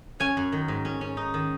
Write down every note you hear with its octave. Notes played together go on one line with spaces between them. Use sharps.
C#4 G#5
F#2
D#3
G#2
C#4
C#4
D#4
D#3